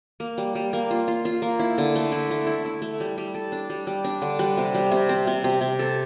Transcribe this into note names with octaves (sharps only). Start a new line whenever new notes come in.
A#3
G3
G3
A#3
F4
F4
F4
A#3
E4
D3
A3
E4
A3
E4
E4
A3
G3
G3
A4
D4
G3
G3
D4
D3
G3
C3
G3
C3
C4
C3
C3
C3
A4